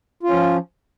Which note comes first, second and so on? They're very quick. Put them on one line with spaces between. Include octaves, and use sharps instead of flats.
F4 C#4 F3